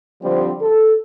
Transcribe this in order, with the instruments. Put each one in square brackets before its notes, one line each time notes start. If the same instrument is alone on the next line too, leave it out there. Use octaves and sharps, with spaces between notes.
[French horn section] D3 F3 G3 C4
A4